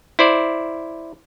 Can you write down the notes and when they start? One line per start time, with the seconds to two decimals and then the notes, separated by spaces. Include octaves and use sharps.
0.19 E4 C5 D5